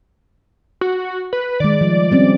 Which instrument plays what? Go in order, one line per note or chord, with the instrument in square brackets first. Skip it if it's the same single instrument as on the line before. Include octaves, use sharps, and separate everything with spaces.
[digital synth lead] F#4
B4
[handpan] D#3 G#3 [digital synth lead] D5
[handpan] F3 G3
G3 C4 C#4